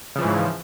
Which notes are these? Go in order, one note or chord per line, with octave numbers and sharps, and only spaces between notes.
G#2 C#3 E3 F3